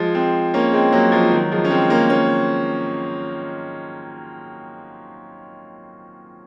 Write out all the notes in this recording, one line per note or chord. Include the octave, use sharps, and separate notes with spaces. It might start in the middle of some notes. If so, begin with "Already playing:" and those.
Already playing: F3 G#3
G#3 C4
A#3 C#4
G#3 C4
F#3 A#3
F3 G#3
D#3 F#3
F3 G#3
C#4
G#3 C4
A#3 C#4
A#3 C#4